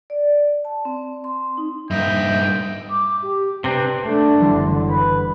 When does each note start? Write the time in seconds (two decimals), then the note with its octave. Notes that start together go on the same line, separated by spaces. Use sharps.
0.10 D5
0.65 A5
0.85 C4
1.24 C6
1.57 D#4
1.91 G2 A#3 D#4 D#5 E5 G5
2.90 D6
3.23 G4
3.64 C3 C4 D4 B4
4.04 A3 D4
4.40 F#1 D3 E3 G3 C6
4.88 B4